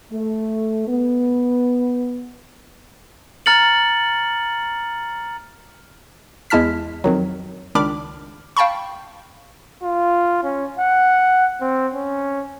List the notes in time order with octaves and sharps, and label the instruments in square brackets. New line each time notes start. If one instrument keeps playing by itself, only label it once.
[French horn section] A3
B3
[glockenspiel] A#5 F6 A6 C#7 F#7
[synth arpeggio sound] E2 G#3 E4 A5 F6 B6
F2 D#3 F#3
C#2 D#3 D4 B5 D6 F6
F5 G5 A5 B5 C#6
[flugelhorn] F4
C#4
F#5
C4
C#4